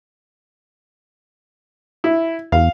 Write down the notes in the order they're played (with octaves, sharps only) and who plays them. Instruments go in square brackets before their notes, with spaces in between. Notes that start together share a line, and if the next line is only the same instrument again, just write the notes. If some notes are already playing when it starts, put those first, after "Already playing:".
[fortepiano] E4
[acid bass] E2 [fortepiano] F5